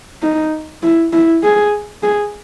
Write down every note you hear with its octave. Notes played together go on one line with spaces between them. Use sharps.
D#4
E4
E4
G#4
G#4